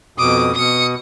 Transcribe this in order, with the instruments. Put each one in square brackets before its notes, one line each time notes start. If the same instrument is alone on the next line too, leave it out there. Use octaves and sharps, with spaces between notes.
[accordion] F2 B2 D#6 [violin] D6
[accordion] B2 [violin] D#6 C#7